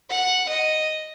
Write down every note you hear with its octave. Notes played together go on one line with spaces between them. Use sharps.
F#5
D#5